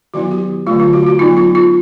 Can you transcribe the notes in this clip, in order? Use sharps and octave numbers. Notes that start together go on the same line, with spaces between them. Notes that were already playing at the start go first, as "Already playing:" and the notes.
D#3 F#3 B3 E4 F#4
G4
D3 F#3 A3 F4
F4
F#4
F#4
F#3 B3 D#4 F4
F4
F4